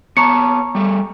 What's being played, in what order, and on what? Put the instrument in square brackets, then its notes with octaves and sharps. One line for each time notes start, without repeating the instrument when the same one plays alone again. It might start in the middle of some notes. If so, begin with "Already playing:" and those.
[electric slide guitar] B3 C#5 A5 [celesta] A#5 C#6 C#7
[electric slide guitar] G3 A3